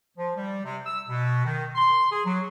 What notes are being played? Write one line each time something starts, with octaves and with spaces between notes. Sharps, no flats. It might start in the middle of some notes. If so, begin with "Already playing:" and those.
F3
G3
C3
E6
B2
D#3
C6
G#4
F#3